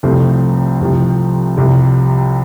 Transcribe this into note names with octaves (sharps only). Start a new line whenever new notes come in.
C2 C3 F3 A3 C4
C2 C3 F3
C2 C3 F3